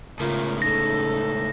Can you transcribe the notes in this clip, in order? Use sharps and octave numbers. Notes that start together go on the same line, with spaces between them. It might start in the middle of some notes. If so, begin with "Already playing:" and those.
C#2 A2 C#3 F4 A#4
D#4 A4 A#6